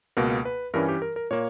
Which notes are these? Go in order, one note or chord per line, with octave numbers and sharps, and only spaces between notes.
C#2 B2 A#3 A#4
B4
G2 E3 G3 C#4 A#4
G4
A#4
A#4
A#2 A#3 C#5